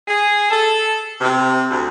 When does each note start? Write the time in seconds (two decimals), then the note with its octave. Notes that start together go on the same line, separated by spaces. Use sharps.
0.08 G#4
0.50 A4
1.21 C3
1.69 D2